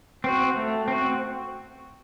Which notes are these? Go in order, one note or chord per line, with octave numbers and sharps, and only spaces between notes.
C4 F#4
A3
C4 F#4